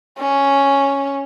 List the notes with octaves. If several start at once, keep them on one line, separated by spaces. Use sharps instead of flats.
C#4